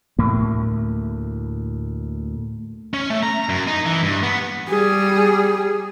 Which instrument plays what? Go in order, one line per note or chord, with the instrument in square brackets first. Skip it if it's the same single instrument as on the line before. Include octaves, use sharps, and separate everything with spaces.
[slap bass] D2 A2 A#3
[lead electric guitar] C#4
A3
A#5
F#2
D#4
E3
G2
B3
[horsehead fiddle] G3 G#4